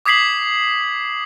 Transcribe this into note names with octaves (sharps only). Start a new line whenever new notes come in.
D6 D#6 G#6 B6 C7 F#7